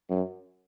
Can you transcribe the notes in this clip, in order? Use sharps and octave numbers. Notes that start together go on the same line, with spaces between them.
F#2